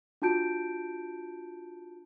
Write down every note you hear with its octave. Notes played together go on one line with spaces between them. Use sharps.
D4 F4 F#4 A5 G6 D7